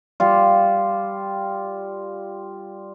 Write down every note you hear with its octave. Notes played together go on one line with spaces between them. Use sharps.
G3 F4